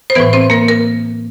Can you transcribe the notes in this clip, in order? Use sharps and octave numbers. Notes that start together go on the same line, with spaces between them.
C5
A2 E3 B3 B4
C4 C5
A#3 A#4
A#4